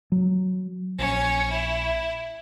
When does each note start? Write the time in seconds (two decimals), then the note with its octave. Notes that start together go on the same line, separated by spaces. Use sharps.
0.12 F#3
0.99 A#1 C#4 C#5
1.51 E4